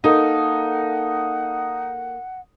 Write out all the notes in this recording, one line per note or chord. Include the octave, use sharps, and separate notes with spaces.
A#3 D#4 A4 F#5